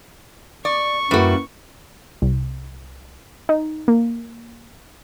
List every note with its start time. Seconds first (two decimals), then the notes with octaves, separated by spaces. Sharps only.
0.65 D5 C#6
1.11 F#2 G3 A#3 E4 F#4 B4
2.22 C2
3.49 D#4
3.88 A#3